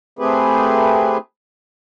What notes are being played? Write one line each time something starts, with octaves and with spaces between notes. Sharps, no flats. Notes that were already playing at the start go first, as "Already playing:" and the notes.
A3 C4 G4 G#4 B4